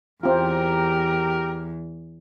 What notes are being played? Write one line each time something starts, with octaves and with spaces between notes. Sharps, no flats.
E2 C4 F4 G4 A#4